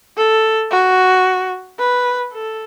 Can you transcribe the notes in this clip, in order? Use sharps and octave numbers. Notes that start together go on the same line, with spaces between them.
A4
F#4
B4
A4